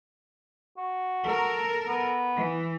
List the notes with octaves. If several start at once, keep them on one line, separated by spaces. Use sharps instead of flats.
F#4
A4 A#4
B3
E3